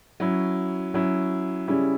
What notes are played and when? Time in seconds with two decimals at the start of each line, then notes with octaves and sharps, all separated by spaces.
0.20 F#3 C#4 E4
0.94 F#3 C#4 E4
1.68 C#3 G3 C#4 E4